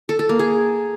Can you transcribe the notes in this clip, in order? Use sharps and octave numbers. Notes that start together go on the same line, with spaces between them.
A4
A4
A#3
G#4